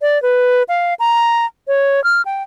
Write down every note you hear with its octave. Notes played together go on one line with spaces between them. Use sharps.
D5
B4
F5
A#5
C#5
F6
G5